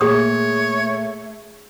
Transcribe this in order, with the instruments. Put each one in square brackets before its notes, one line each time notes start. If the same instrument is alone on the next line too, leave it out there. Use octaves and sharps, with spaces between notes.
[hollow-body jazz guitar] A#2 [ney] A3 [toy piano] G#4 D#6 [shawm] C#5